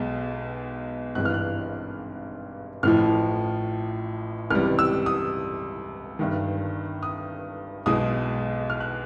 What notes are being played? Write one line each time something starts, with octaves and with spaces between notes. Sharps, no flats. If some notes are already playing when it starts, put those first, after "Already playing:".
Already playing: B1 B2 G#3
G#1 G2 E3 G#3 F#6
F6
F#6
A1 A2 F3 F6
C#2 C3 E3 G3 F6
E6
D#6
G1 G2 D#3
D#6
B1 B2 G#3 D#6
F6
F#6